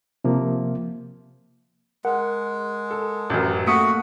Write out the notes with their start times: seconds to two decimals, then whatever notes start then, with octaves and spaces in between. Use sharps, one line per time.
0.24 C3 F3 A#3
2.05 G#3 A#4 F#5
2.91 A4
3.30 A1 F#2
3.67 A3 A#3 F#4 A4 D#6 B6 C#7